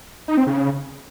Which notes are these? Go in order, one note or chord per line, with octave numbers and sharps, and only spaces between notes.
D#4
C4
C#3